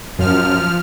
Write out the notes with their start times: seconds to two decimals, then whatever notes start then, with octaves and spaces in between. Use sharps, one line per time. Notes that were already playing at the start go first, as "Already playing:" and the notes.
0.19 F#2 F3 F6